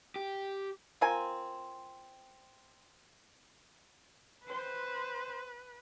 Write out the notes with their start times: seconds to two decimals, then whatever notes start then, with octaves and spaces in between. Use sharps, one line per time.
0.16 G4
1.01 C4 F4 A#4 G#5
4.48 B4 C5